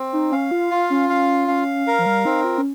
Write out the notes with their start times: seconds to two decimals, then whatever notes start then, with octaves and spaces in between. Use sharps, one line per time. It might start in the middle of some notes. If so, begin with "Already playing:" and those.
Already playing: C4
0.13 D#4
0.32 C#4 F5
0.51 F4
0.71 F4
0.90 C#4
1.09 C#4 F5
1.48 C#4 F5
1.87 A#4
1.99 F3
2.06 G3
2.25 C4 D#4
2.44 F4
2.58 C#4